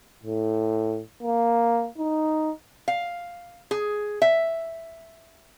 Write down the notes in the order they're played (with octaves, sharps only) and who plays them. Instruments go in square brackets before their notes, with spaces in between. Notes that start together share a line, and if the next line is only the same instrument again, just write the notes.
[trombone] A2
A#3
D#4
[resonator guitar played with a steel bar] F5
G#4
E5